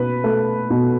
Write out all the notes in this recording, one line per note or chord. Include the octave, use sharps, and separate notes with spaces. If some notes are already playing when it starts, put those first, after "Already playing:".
Already playing: B2 B4
A3
B2